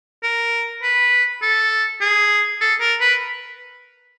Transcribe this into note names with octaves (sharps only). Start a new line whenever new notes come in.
A#4
B4
A4
G#4
A4
A#4
B4